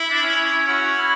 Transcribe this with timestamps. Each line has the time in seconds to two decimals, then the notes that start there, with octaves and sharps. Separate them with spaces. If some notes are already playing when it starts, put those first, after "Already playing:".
Already playing: E4
0.11 D4
0.22 C#4
0.67 C#4 F#4
0.98 E4